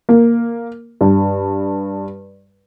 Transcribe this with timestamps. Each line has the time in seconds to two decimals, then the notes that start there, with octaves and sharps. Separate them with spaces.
0.09 A#3
1.01 G2